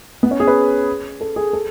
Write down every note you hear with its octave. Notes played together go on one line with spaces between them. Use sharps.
B3
C#4
G#4
B4
A4
G#4
A4